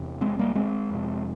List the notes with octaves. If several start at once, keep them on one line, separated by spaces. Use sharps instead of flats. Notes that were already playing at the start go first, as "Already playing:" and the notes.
Already playing: E2 C3
G#3 C4
G3 A#3
G#3 C4
F2 C3